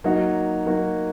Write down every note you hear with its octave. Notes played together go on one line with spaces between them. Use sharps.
F#3 A#3 D#4 F#4
F#3 A#3 D#4 F#4